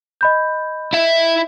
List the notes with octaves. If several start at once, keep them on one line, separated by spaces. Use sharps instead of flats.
D#5 B5 G6
E4 E5